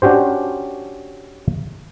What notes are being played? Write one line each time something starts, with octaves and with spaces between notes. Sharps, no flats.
C#4 D4 F#4 G4 C5